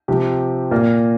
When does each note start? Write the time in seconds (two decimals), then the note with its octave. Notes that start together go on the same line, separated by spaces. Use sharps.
0.08 C3 F3 C4 G4
0.71 A#2 A#3 A#4